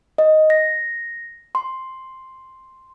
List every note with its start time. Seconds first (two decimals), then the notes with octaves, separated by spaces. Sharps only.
0.18 D#5
0.50 A#6
1.55 C6